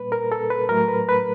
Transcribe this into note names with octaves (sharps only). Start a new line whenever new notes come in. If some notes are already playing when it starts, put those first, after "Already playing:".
Already playing: A#2 G3 A#3 B4
A#4
A4
B4
A2 F#3 A3 A#4
B4
B4